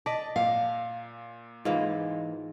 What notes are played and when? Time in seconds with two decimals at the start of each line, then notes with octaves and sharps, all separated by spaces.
0.06 D5 D#5 A5 A#6 B6
0.36 A#2 F5
1.65 G#2 E3 A#3 F4